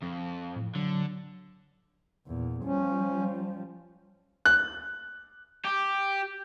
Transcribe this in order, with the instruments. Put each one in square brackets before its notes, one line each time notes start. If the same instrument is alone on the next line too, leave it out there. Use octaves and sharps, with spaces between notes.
[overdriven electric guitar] F2
[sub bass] A2
[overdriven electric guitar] D3 [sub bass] F#3
[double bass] E2 A#2
[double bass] F3 G3 [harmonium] C#4
[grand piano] F#6
[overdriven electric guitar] G4